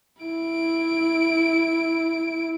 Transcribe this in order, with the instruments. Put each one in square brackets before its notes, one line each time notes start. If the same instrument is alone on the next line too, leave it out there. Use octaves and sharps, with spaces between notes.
[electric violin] E4 D7